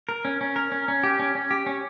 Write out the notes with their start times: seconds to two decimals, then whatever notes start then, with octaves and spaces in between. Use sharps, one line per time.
0.09 A#4
0.25 C#4
0.41 C#4
0.56 A#4
0.72 C#4
0.88 C#4
1.03 G4
1.19 C#4
1.35 C#4
1.51 G4
1.66 C#4